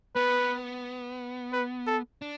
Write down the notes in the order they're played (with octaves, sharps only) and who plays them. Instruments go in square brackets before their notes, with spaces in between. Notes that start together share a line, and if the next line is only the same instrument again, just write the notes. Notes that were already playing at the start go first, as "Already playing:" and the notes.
[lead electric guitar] B3 [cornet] B4
[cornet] B4
A4
[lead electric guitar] D4